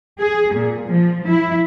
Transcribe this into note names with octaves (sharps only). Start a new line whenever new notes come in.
G#4
A#2
F3
E4